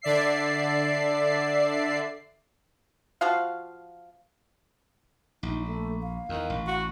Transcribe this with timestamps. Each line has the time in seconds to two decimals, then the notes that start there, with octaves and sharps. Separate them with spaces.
0.02 D3 D5 E5 C7
3.21 F3 F#4 F5
5.43 A#1 D#4
5.66 A3
6.02 F5
6.29 E2 D#3
6.50 A1
6.68 F#4